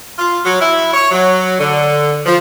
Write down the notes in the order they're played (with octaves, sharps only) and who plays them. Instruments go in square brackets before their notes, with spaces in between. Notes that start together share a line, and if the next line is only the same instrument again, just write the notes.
[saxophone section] F4
F#3
E4
C#5
F#3
D3
F3